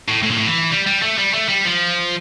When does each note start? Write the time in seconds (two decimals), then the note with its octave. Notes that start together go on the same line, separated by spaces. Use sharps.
0.08 A2
0.23 A2
0.30 A#2
0.38 A2
0.47 E3
0.70 G3
0.86 G3
1.02 A3
1.17 G3
1.33 A3
1.48 G3
1.65 F3